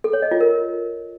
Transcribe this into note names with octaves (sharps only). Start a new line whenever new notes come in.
A4
C#5
D#5
F4
A#4